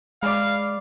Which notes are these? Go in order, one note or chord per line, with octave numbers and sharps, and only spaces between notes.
G#3 D5 F5 B5